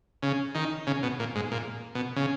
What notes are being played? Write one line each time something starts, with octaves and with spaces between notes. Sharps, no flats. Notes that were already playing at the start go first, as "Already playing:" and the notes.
C#3
D#3
C#3
B2
A#2
G#2
A#2
B2
C#3